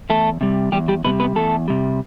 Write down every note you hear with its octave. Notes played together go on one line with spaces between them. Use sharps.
E2 A3 A4
C3 G3
E2 G3 G4
G3 G4
C3 G3 B3 B4
B3 B4
E2 A3 A4
C3 G3